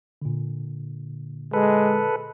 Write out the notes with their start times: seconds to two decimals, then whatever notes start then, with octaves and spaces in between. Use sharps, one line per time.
0.22 A#2 D3
1.54 G#3 A4 B4